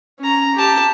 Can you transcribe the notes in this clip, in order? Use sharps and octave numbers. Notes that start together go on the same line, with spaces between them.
C#4 A#5
G4 A5